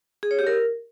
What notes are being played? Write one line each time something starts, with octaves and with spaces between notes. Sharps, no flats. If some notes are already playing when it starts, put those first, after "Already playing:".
G#4
C#5
G4
A#4